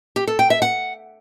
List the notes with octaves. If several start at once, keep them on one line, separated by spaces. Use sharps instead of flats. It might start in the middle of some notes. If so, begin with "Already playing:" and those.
G4
A4
G5
E5
F#5